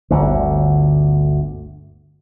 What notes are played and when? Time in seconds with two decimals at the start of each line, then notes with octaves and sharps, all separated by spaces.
0.11 G1 D2 D3